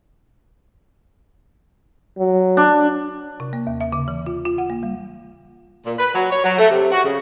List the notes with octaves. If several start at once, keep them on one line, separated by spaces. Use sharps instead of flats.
F#3
D4
C3
A#3
D#2
E5
C#3
E3
F4
F4
F#5
A#3
G3
A#2
B4
F#3
C#5
F#3
A3
C3
F#4
C#3